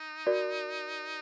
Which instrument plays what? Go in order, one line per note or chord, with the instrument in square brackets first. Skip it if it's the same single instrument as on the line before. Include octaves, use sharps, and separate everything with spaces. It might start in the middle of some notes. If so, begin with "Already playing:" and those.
Already playing: [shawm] D#4
[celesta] F#4 A#4 D5